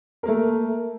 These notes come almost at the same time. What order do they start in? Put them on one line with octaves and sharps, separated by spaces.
A#4 A#3 A3